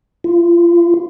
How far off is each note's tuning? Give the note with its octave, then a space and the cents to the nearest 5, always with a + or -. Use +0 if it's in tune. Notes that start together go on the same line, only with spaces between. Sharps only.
F4 -30